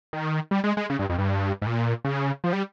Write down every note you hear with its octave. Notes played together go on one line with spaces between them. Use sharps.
D#3
G3
G#3
G#3
C#3
G2
F2
G2
G#2
A#2
C#3
F3
G3